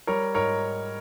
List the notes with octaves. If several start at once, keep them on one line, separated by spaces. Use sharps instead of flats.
G3 A#4 C#5
G#2 A#4 C#5